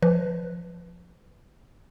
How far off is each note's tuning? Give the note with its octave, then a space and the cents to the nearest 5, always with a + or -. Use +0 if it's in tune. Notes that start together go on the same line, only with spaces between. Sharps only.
F3 +0 B4 +0